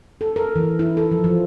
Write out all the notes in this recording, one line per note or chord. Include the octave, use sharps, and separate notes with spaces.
A4
A#4
E3
E4
A4
F3
F3